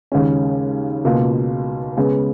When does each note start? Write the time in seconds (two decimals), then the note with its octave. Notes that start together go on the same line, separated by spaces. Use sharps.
0.12 D#2 C#3 G#3 C#4
1.05 C#2 B2 A#3 F4
1.97 C#3 G#3 B3